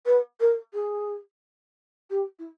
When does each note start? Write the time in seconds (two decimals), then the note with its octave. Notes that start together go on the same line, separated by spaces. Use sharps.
0.05 B4
0.40 A#4
0.73 G#4
2.10 G4
2.38 E4